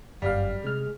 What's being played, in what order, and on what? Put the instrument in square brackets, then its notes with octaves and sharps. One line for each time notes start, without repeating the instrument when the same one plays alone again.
[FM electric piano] G1 F5 [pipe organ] F#2 [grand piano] G3
[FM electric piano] C3 F6 [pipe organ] G#3